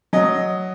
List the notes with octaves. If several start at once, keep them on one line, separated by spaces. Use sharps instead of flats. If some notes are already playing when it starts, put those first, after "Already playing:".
F#3 D#5